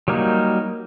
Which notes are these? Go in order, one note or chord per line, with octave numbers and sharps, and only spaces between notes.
F#3 G3 A#3 D#4